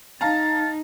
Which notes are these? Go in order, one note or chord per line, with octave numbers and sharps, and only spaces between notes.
D#4 F5 A5 A#5 A6